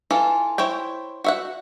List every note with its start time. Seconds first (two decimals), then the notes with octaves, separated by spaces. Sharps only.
0.11 E3 F4 A4
0.58 E4 C5 C#5 G5
1.24 F#4 E5 F#5